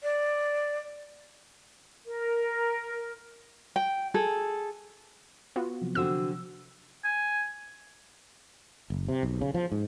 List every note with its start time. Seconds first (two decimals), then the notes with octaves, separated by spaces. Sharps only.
0.03 D5
2.05 A#4
3.76 G5
4.14 G#4 A4
5.56 B3 F4 F#4
5.81 C3 F3 F#3
5.95 D3 C4 F#4 E6
7.05 G#5
8.90 F#1
9.08 C3
9.23 B1
9.41 C#3
9.54 F3
9.72 G#2